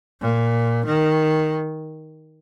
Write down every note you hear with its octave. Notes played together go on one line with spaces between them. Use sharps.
A#2
D#3